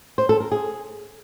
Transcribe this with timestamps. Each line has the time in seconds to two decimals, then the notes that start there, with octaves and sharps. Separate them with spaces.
0.18 C5
0.29 A4
0.40 A#4
0.52 G#4